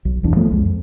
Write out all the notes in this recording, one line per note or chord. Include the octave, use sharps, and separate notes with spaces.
B1
F#1 B1 E2 D4
E3 F3 A3 B3
C#2 F#2 G#3
F2